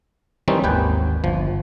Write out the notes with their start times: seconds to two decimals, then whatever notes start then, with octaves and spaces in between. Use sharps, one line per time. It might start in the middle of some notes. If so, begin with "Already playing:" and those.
0.48 D#3 E3 G3 C4 C#4 D#4
0.64 G#1 D#2 B4 G5 G#5
1.24 G1 F3